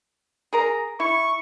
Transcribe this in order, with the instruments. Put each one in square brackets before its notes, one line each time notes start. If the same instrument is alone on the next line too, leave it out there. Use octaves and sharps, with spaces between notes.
[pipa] G#4 A#4 A#5
[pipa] E4 [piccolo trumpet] C#6